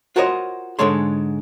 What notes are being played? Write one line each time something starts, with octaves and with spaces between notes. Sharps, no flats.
F4 F#4 A#4 C5 C#5 D#5
G#2 D3 G#3 A4 C#5 C6